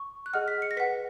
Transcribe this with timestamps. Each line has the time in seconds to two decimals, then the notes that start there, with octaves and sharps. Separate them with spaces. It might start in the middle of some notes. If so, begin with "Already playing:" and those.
Already playing: C#6
0.26 F#6
0.33 G#4 D#5 F#5 F6
0.48 B6
0.62 C#7
0.71 A#6
0.77 B4 F#5 B6